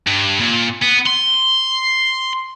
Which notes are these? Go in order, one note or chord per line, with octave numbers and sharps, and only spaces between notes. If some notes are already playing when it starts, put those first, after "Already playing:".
G2
A#2
B3
C6